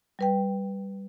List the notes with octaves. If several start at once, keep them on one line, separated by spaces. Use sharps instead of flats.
G3 B4 G5